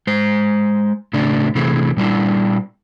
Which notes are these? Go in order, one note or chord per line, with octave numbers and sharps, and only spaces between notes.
G#3 C5
A2 C#3 A3 D4 D5
C3 E3 A3 C4 G#4
A#2 G3 D4 E4